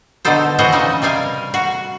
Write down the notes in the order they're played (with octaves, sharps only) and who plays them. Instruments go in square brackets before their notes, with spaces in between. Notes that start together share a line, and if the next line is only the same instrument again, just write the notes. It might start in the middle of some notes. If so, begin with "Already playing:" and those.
[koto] B2 D3 D#4 A4 C5
E3 F#4 C5 D#5
C#3 G3 D#4
C3 G3 A#4 F5 G#5
F#4